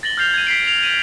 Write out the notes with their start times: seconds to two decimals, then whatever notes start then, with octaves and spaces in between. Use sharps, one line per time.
0.03 A6 A#6 F#7 G7
0.17 F6 G6 C7 F7 G7
0.34 G#6 D#7
0.47 B6 C7 D7
0.67 F7
0.83 G6 D#7 F7 F#7